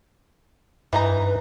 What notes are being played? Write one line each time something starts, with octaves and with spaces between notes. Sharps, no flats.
G2 E3 D#4 B4 A#5